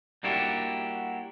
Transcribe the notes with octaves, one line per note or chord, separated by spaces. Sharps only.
G3 A#3 D4 E4 F#4 G4